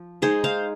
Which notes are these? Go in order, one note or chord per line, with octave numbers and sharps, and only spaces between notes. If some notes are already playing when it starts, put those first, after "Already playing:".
Already playing: F3
G#3 D#4 G#4 C5
C5 F5